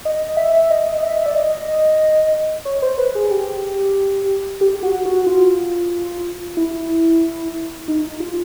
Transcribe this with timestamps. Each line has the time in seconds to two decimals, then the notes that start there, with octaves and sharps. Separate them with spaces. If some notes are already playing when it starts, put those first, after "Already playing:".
0.05 D#5
0.37 E5
0.71 D#5
0.98 D#5
1.03 E5
1.26 D5
1.35 D#5
2.65 C#5
2.82 C5
2.98 B4
3.15 G#4
3.31 G4
4.61 G4
4.83 F#4
5.05 F#4
5.26 F4
6.57 E4
7.88 D#4
8.20 F4